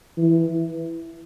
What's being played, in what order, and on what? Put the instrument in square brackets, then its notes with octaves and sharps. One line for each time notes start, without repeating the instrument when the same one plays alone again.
[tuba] E3